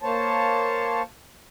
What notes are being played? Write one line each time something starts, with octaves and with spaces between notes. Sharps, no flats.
A#3 C5 C#5 A5